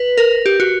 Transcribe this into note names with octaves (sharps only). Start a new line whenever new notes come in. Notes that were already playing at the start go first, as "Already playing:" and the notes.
Already playing: B4
A#4
G4
F#4